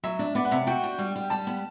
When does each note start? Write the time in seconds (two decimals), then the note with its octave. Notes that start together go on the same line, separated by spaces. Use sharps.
0.03 F#3 E5
0.19 D4
0.35 B3 D5
0.45 F#5
0.51 C3 E5
0.67 F#4 G5
0.84 D4
0.99 G3
1.16 G3
1.30 G3 A5
1.47 B3